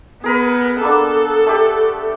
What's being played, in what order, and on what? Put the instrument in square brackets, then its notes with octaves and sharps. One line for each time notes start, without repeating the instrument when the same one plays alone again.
[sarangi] B3 [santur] G#4 A#4 B4
[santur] A#3 B3 D4 [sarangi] A4
[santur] A3 G4